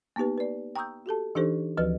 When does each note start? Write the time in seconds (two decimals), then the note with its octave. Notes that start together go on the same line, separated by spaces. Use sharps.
0.16 A#3 B3 D#4 G4 B4
0.38 B4 D5
0.76 G5 A#5 C#6 D#6 E6 G6
1.06 F#4 G4 A4 A5
1.35 E3 D4 D#4 G4 A4 C5
1.77 D2 E3 F3 F#4 B4 D#5